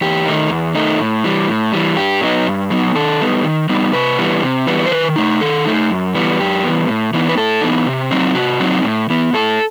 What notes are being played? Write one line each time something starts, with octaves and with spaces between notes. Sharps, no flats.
E2 G4
D#3 A3 D#4
E2
D#3 A3 D#4
A2
E3 G3
A2
E3 G3
G2 G4
F#3 B3 D#4
G2
F#3 B3 D#4
D#3 A4
G3 B3 D#4
D#3
G3 B3 D#4
C3 B4
E3 G3 B3
C3
E3 G3 B3
C5
D#3 B4
A3 D#4
D#3 A4
A3 D#4
F#2
E3 G3 B3
F#2 G4
E3 G3 B3
A2
E3 B3 D#4
B4
A2 A4
E3 B3 D#4
C3
F#3 C4 D#4
C3 F#4
F#3 C4 D#4
A2
E3 B3
A2 A4